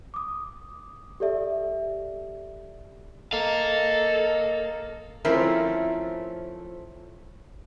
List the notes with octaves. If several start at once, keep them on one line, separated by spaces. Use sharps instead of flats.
D6 D#6
G4 A4 D5 E5
A4 A#4 D#5 F5
F3 A3 C4 C#4 E4 A#4